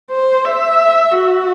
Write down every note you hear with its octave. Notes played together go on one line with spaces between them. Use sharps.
C5
E5
F#4